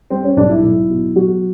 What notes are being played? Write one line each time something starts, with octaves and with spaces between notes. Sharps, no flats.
G3 C4
C#4
B1 D4
E4
B1
B2
F#3 F#4